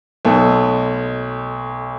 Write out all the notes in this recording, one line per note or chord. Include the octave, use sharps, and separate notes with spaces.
B1 B2 A3